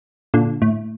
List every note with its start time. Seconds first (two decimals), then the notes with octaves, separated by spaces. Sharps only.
0.34 A#2 D3
0.62 A2